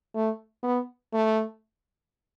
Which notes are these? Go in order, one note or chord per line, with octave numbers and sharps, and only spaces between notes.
A3
B3
A3